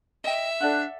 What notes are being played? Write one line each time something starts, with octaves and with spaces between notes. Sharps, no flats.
D#5 E5 G5
D4 A4 D5 F#5 F#6